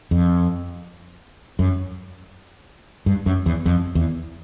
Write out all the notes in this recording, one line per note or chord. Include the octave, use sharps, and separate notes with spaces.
F2
F#2
G2
F#2
E2
F2
E2